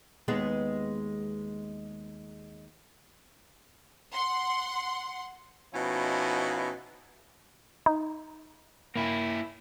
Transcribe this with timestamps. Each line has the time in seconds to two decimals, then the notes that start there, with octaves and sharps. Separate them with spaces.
0.28 D#2 G#3 B3
4.13 F#5 C6
5.74 B2 F3 C#4 D#4 E4
7.86 D#4
8.96 A#3 E4